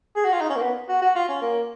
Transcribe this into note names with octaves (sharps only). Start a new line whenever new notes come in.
G#4
F#4
F4
D#4
C#4
A#3
B3
F#4
F#4
F4
C#4
A#3